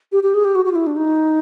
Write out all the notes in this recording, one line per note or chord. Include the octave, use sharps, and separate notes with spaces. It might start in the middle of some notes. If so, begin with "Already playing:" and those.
G4
G4
G#4
G4
F#4
F#4
F4
E4
D4
D#4